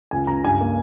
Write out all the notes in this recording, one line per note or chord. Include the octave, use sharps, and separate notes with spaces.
C#2 G#5
C#2 A#5
G2 G#5
A#3